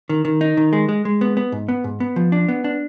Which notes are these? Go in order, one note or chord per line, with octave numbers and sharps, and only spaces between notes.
D#3
D#3
D#4
D#3
G#3
G#3
G#3
B3
B3
G#2
B3
G#2
B3
F3
D4
B3
D4